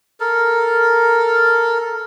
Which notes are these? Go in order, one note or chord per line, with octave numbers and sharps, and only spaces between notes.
A4 A#4